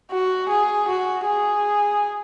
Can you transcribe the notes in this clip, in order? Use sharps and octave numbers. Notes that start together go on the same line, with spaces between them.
F#4
G#4
F#4
G#4